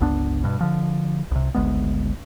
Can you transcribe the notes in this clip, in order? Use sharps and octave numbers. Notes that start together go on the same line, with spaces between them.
G1 C#2 B3 D4
G2 B2
D3 F3
C2 C3
G#1 D2 G#3 B3